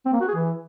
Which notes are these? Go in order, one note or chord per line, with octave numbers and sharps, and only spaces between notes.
C4
A#3
F#4
G#4
E3